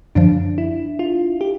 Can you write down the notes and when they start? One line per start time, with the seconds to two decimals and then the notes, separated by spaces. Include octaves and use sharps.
0.15 F#2 D3 F3 D4
0.58 E4
0.99 F4
1.41 G4